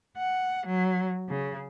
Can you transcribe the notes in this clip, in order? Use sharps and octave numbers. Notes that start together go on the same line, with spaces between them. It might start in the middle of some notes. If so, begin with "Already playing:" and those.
F#5
F#3
C#3